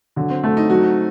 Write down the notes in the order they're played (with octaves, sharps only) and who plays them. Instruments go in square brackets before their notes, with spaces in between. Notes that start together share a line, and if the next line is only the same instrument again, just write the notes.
[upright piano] D3 [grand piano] F#3
[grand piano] C4
[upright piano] A3
[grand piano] D#4
[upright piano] F#3 [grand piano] F#4